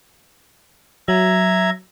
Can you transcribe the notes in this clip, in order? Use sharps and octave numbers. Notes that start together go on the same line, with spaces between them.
F#3 E5 A#5 G#6